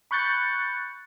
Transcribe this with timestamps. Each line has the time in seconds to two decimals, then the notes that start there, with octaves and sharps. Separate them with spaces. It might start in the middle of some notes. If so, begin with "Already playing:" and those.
0.11 B5 C#6 F#6 G6 A6 C#7